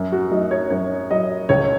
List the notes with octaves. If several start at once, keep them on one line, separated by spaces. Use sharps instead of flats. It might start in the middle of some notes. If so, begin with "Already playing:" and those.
Already playing: F#2
F#4
F#3 D#4
C#5
F#2 C#5
F#3 D#5
C#2 C#5